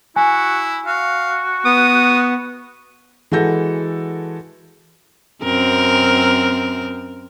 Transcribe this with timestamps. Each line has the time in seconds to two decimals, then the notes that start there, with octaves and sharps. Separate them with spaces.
0.16 E4 F#4 G#5
0.86 F#4 F5
1.65 B3 D#6
3.32 E3 G#3 F#4 A4 G6 A#6
5.43 F#2 C4 A#4